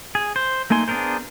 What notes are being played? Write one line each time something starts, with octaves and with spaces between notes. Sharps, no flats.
G#4
C5
A3 A#3 D#4 G#5 C6
B3 D4 G#4 A#4 C5